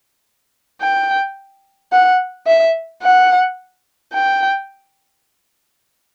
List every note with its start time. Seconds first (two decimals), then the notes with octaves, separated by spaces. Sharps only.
0.81 G5
1.92 F#5
2.47 E5
3.03 F#5
4.13 G5